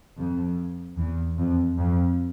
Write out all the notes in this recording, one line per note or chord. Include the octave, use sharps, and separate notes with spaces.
F2
E2
F2
F2